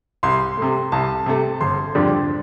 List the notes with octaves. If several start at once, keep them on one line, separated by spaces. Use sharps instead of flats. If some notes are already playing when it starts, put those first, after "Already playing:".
C2 C6
C3 A3
C2 A5
C3 A3
G1 C6
F2 D3 G3 D4